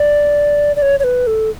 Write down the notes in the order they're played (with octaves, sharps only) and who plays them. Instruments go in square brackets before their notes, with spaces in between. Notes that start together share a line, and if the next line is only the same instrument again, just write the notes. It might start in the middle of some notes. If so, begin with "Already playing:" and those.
Already playing: [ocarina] D5
D5
C#5
C#5
B4
A4